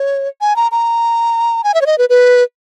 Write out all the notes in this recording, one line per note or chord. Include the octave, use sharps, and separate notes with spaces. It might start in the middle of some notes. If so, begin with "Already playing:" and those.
Already playing: C#5
G#5
A#5
A#5
G#5
E5
C#5
D#5
B4
B4